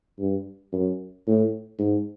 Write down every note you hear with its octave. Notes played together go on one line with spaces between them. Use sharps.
G2
F#2
A2
G#2